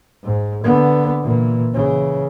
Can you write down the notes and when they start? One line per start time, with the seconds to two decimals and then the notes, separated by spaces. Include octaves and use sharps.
0.23 G#2
0.64 D3 B3
1.23 A#2 E3
1.74 C#3 E3